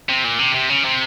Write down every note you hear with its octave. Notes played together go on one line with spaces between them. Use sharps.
C3
A#2
C3
C3
C#3
C3